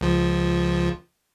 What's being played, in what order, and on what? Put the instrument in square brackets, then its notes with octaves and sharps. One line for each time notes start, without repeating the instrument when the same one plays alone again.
[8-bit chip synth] C#2 F3